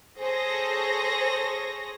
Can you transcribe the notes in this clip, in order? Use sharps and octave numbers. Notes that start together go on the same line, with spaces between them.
G#4 A4 C5 C#5 A#6